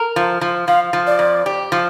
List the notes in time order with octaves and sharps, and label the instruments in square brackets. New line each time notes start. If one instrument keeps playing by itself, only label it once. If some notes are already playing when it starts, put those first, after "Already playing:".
Already playing: [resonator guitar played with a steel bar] A#4
F3
F3
[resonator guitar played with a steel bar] F3 [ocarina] F5
[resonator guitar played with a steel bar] F3
[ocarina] D5
[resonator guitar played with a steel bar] F2
G4
F3